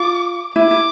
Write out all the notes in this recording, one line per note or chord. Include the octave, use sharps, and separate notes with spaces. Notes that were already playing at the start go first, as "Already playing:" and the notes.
Already playing: F4 D6
E4 D6
E4